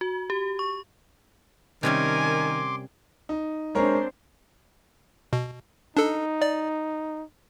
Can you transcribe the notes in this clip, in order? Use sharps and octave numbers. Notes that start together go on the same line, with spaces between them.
F#4
G4
C#6
C3 D#3 G3 C#4 A#4 G#5 C6 D6
D#4
G#3 C4 D4 A#4 C5 C#5
B2
D4 D#4 A4
D5